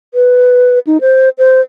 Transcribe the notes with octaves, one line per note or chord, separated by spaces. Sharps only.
B4
D#4
C5
C5